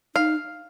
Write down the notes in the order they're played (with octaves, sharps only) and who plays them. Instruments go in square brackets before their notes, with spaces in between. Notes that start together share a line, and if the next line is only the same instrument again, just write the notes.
[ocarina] D#4 [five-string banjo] F5